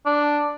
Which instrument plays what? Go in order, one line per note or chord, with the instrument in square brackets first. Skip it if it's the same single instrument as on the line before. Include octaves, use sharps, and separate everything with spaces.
[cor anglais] D4